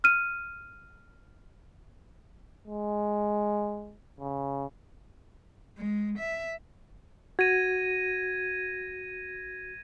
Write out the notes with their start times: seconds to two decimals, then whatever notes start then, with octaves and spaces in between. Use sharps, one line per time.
0.04 F6 D#7
2.67 G#3
4.20 C#3
5.78 G#3
6.19 E5
7.39 F#4 G#6 A#6 D#7